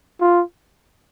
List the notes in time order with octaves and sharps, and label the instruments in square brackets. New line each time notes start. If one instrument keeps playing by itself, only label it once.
[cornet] F4